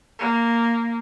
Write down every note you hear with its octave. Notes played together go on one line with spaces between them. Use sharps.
A#3